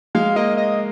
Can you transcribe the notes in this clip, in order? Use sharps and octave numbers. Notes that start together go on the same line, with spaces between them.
G#3 F5
A#3 D#5
D#5